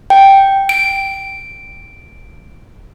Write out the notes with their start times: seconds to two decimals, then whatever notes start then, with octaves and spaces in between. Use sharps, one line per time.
0.10 G5
0.69 D7